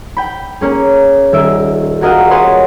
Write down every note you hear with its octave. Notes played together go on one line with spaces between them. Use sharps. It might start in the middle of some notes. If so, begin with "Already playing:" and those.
G5 B5
A#3 C#4 G#4
D#1 E5 D7
F#4 G#4 A#4 D#5 F5 F#5
B4 C#5 D#5 F#5 G#5 C6